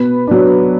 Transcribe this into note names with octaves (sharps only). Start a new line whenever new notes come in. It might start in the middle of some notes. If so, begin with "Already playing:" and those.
Already playing: B2 B4
F#3 D4